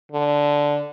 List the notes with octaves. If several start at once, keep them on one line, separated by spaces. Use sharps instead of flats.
D3